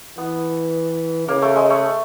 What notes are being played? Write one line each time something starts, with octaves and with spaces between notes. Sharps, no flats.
E3 B3
C#3 A#3
A3
G#3
A3